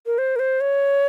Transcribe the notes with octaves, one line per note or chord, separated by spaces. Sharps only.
A#4
C5
A#4
C5
C#5